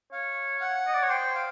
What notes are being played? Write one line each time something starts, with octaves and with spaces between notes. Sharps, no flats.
C#5 F5
F#5
D#5
D5
C#5
C5 G5
F5